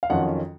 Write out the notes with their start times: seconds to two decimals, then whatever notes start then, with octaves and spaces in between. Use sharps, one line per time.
0.03 F5
0.10 F2 D#3 F#3 C#4 F4 F#5